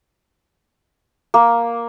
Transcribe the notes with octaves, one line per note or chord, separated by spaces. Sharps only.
A#3